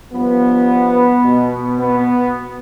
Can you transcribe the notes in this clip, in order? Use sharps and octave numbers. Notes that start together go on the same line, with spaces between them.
G2 F3 B3
B2
B3